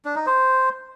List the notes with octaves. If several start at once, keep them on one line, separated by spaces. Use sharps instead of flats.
D4
D#4
C5